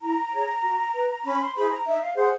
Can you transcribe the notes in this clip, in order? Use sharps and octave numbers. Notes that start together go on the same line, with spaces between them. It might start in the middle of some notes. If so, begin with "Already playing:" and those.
E4 A#5
G#4 C#5
F#4
B4
C#4 B5
C#6
C6
E4 G#4 C5 B5
A#5
D#4 E5
F5
G#4 C5 F#5